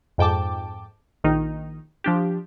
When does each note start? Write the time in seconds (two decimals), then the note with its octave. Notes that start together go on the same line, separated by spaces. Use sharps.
0.18 F2 G#2 G5 A5 D6
1.24 A#1 D#3 D#4
2.04 F3 D4 G4